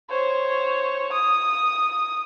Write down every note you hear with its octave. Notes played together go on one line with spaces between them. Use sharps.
C5 C#5
D#6